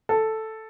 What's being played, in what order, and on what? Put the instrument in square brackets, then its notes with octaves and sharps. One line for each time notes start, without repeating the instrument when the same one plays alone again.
[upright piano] A4